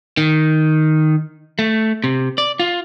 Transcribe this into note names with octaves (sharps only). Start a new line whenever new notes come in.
D#3
A3
C3
D5
F4